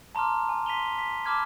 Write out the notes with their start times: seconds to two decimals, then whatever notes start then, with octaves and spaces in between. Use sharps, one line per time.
0.15 A5 A#5 C6 D6 F6
0.49 G#5
0.66 C6 B6 D#7 F7 G7
0.99 B6
1.26 A5 B5 D6 F6 G#6